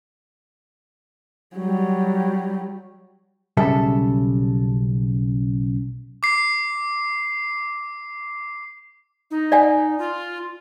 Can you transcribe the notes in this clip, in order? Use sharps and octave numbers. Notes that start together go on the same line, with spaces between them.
F#3 G3
B1 C#3 G3 A4 E5
D6 C7
D#4
D5 F#5 G#5
F4